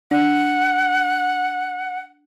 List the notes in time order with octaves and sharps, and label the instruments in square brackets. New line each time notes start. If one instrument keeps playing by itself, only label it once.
[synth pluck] D4 [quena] F#5